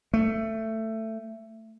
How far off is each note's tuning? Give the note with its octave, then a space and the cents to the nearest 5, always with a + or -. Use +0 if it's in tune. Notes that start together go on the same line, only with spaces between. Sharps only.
A3 +15